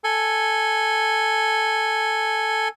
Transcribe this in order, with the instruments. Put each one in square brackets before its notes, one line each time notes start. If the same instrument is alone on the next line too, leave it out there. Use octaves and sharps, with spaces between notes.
[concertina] A4 G#5